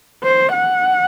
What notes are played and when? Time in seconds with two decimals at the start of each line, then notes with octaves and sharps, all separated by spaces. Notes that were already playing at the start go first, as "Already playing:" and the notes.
0.24 C5
0.52 F#5